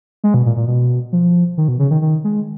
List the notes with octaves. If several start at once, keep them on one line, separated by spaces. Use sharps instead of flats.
G#3
B2
A#2
A#2
B2
F3
D#3
B2
C#3
D#3
D#3
G#3